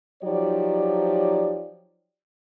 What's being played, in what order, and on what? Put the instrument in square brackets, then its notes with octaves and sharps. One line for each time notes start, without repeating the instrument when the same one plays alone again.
[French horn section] F3 F#3 D#4 G4 C#5 D5